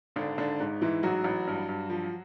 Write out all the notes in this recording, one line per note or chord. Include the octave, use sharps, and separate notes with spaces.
G#1 D3 D4
G#1 D3 D4
G#2
G#2 E3 E4
A1 F#3 F#4
A1
G2
G2
F3